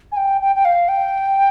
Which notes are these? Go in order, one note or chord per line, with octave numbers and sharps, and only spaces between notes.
G#5
G5
G5
G5
F5
G5